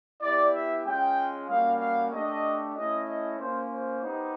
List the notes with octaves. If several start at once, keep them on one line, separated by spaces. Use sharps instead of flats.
B3 E4 G4 D5
E5
G#3 C#4 F4 G5
G3 A#3 C#4 F#4 F5
F5
A3 D4 G4 D#5
A3 C#4 E4 D#5
D#5
A#3 C#4 F4 C5
C5
B3 D#4 G4